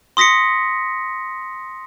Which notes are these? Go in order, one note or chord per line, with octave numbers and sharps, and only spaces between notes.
C6 D#6 A#6 B6 C#7